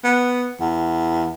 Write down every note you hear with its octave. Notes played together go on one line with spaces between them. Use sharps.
B3
E2